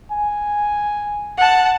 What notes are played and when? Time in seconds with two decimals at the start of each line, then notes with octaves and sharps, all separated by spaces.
0.12 G#5
1.38 F#5 A5